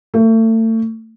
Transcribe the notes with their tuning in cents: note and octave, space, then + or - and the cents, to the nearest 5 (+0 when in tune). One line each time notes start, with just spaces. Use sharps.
A3 +35